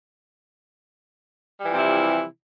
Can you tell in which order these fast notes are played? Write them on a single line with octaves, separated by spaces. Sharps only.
G3 E3 F3 C3 E4